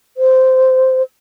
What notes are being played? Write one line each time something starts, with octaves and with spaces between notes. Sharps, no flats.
C5